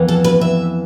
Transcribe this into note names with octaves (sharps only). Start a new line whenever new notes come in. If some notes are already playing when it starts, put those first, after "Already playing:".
Already playing: F2 E3 B3
A4
B4
E5